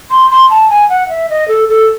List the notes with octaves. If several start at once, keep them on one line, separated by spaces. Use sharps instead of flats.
C6
C6
A5
G#5
F#5
E5
D#5
A4
A4